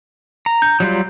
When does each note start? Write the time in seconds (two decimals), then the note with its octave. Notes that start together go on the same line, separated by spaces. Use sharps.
0.46 A#5
0.62 G6
0.80 F#3 G3 F4